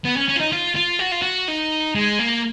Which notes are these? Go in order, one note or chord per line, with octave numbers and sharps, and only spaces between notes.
B3
C#4
C#4
F4
D#4
F4
F4
F#4
F4
F#4
D#4
G#3
A#3